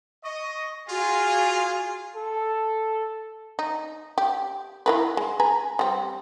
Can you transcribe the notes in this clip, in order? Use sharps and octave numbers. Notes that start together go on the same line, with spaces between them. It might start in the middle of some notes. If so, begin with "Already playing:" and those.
D#5 C#6
F4 F#4 G#4
A4
D#4
G4
E4 A#4 B4
G#3
B4 G#5 A#5
G3 C4